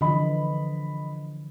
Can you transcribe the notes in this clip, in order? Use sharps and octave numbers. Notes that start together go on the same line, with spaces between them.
D3 E3 F3 D#5 B5